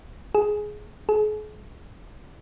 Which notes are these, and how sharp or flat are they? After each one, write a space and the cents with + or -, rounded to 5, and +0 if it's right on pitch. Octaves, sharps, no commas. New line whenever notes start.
G#4 +10
G#4 +40